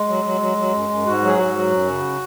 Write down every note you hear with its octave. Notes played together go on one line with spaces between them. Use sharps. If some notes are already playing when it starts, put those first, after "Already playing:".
Already playing: G#3
F#3
F#3
F#3
F#3
F#2
F#2
G#2 F#4
F#3
G#4
G#2 F#4
F#3
F#2
C#3